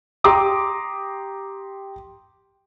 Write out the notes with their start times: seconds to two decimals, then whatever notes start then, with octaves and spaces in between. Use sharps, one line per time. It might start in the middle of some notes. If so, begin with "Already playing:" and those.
0.24 G4 A#5 C6 D6 D#6